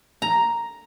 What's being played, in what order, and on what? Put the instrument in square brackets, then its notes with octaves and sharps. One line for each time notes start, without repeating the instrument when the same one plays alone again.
[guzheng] A#5